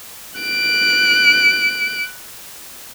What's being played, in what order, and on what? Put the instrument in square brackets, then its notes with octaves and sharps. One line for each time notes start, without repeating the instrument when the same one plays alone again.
[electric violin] F#6 D7